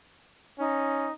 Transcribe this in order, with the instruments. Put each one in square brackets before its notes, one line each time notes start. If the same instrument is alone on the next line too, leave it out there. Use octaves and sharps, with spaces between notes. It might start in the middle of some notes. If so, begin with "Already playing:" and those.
[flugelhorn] C#4 [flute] D#4